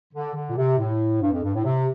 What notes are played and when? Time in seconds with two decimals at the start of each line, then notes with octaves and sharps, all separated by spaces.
0.14 D3
0.35 D3
0.49 A#2
0.56 C3
0.78 A2
1.21 G2
1.32 F2
1.43 G2
1.54 A2
1.65 C3